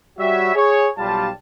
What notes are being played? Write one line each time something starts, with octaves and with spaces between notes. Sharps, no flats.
G3 F#4 C#5 E5
G#4 C#5
B1 G3 F4 A5